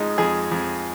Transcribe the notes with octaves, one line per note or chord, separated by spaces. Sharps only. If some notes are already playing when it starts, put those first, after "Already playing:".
Already playing: F2 F3 G#3 D#4
F2 G#4
F2